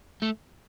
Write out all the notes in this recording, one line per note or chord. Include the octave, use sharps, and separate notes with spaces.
A3